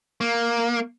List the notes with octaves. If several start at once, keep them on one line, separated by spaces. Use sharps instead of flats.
A#3